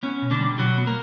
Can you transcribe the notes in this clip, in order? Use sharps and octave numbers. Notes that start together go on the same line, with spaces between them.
B3 C#4
B2
D3 D4
G3
B2 F#3 F#4
B3
A#3 A#4